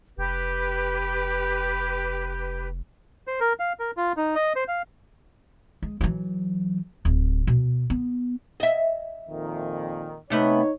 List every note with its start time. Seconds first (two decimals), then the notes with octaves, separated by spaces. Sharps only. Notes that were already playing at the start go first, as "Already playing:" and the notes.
0.18 F1 G4 B4
3.27 C5
3.40 A#4
3.60 F5
3.79 A#4
3.97 F4
4.17 D#4
4.35 D#5
4.56 C5
4.68 F5
5.83 G#3
6.01 E3 F#3
7.05 D1
7.47 B2
7.90 B3
8.60 D#5 E5
9.28 F2 A#2 D#3
10.30 C3 A3 B3 D#4 C#5